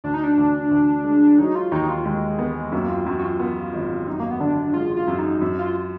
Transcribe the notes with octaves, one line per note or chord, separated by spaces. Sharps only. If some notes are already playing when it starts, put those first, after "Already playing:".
D2 D4
D#4
D4
D2
D2
G#3
F#3 D#4
F4
D#2 D#4
F4
D#2 G#3
B3
F#2 A#3
F4
F#2 F#4
F#4
F4
B3
G#1
F#2 D#4
A#3
B3
D3 D4
G#3 F4
F4
F#2
D#4
F#2
F4